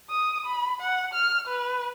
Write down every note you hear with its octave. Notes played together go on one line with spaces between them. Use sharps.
D#6
B5
F#5
F6
B4